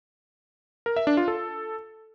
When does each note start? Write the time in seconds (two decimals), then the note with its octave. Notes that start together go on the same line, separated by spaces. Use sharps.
0.86 A#4
0.96 E5
1.07 D4
1.17 F4
1.28 A4